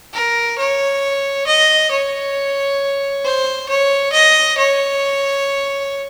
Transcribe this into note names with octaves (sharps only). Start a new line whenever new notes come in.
A#4
C#5
D#5
C#5
C5
C#5
D#5
C#5